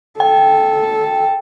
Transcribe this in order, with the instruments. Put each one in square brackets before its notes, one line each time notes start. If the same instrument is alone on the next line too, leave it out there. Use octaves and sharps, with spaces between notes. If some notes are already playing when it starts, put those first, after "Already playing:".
[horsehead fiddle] A4 [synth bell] G5